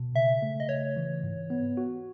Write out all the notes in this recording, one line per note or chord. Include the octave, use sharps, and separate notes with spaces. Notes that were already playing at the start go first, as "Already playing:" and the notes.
Already playing: B2
C#3 E5
A3
D#5
C#3 C#5
E3
G#2
B3
F#4